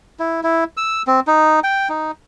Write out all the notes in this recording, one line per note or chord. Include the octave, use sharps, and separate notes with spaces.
E4
E4
E6
C4
D#4
G5
D#4